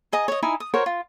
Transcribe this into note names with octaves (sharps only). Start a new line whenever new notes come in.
G#4 D#5 A#5
C#5 D#5
D#4 E4 D#5 G#5
D#6
F#4 A#4 C5 C#5
F4